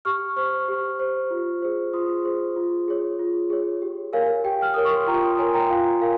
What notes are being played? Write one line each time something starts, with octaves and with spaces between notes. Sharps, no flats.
G4 C#6 F6
C5 C#6 F6
G4
C5
F4
G#4 C5
F4 C6 D#6
G#4 C5
F4
G#4 C#5
F4
G#4 C#5
G4
A#4 C#5 F5 G#5
G4 G5
F6
A#4 C#5 D#6
C#6
C6
F4 G5 A#5
C6 D#6
A#4 C#5 G#5 C6
G5 A#5
G5
F4 F5 G#5
A#4 F5 G#5